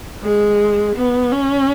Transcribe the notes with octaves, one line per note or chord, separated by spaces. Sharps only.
G#3
B3
C#4